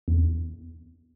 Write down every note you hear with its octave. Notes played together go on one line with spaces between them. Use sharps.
E2